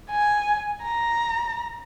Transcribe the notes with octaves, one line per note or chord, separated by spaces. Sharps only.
G#5
A#5